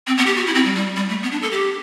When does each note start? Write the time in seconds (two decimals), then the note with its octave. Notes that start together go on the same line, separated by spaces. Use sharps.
0.07 C4
0.17 B3
0.26 G4
0.36 F#4
0.46 E4
0.55 C4
0.65 G3
0.75 G3
0.96 G3
1.09 A3
1.23 B3
1.32 D4
1.42 A4
1.52 G4